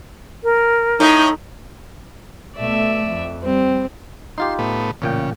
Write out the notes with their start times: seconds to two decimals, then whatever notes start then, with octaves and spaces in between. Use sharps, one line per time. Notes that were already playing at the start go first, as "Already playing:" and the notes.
0.44 A#4
1.00 A2 D#4
2.56 B2 A3 D5 E5
3.05 F2
3.43 G3 C4
4.38 D#4 F4 G4 C6
4.59 A2 B3
5.02 A1 A#2 C#3 G5